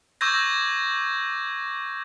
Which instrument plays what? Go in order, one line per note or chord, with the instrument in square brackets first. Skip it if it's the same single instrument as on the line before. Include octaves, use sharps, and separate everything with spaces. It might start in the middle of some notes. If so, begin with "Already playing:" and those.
[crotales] C#6 D6 E6 G6 G#6 A#6